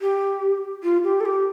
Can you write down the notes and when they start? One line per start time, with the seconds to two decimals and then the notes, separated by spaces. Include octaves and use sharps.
0.01 G4
0.83 F4
1.04 G4
1.20 A4
1.25 G4